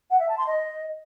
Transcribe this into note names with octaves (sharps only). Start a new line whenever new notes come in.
F#5
E5
A5
C6
D#5